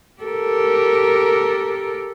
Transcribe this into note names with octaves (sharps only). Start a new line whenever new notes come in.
G4 A4 A#4